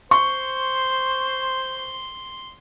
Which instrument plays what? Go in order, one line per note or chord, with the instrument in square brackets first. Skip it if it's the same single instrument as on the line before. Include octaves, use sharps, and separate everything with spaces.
[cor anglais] C5 [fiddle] C6 [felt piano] C#6